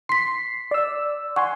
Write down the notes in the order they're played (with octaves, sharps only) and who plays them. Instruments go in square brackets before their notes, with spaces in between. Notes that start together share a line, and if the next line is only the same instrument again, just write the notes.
[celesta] C6 B6 [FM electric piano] C7
[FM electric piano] D5 E6
[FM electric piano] F#5 G#5 C6 [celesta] C#6